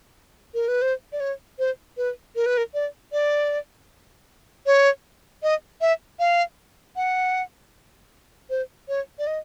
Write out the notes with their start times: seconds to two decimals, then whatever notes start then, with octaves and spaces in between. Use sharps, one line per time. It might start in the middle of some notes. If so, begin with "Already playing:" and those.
0.54 A#4
0.68 B4
0.82 C5
1.12 D5
1.20 C#5
1.59 C5
1.97 B4
2.36 A#4
2.46 B4
2.57 A#4
2.74 D5
3.12 D5
4.66 C#5
5.43 D#5
5.81 E5
6.19 F5
6.96 F#5
8.50 C5
8.89 C#5
9.19 D5
9.27 D#5